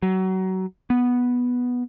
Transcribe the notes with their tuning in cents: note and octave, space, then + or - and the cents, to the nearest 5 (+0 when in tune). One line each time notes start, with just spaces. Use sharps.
F#3 +25
B3 -5